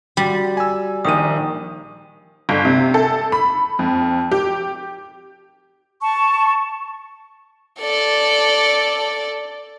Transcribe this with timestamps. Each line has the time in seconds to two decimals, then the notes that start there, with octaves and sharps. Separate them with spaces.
0.17 G3 F#4
0.57 G#5 E6
1.05 A#1 D#3 G5 G#5 D#6 D#7
2.49 G1
2.65 C3
2.94 A4
3.32 B5
3.79 F2
4.32 G4
6.03 A5 C#6
7.80 A4 D5